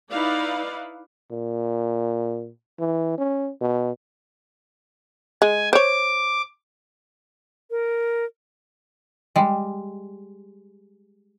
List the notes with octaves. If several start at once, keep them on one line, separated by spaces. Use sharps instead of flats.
D#4 E4 B4 D5 F5
A#2
E3
C#4
B2
G#3 G#5
C5 C#5 D6
A#4
G3 G#3